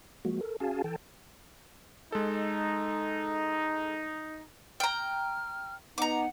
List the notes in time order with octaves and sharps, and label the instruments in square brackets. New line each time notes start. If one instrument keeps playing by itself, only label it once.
[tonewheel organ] F3 G#3 A#3 F#4
A4 A#4
C#4 F#4 G#4 F5 G#5 A5
E3 A4 G5 A5
[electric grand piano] G#3 A4 [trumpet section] D#4
[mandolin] G5 A#5 [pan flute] F6
[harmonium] B3 D#4 [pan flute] F#5 [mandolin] A#5 D6